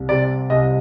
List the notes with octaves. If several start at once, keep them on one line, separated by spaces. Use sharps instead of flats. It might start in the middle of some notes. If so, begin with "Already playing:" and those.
Already playing: C2
C3 D5
C2 D#5